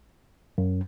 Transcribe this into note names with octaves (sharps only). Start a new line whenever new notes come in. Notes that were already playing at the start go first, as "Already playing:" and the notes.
F#2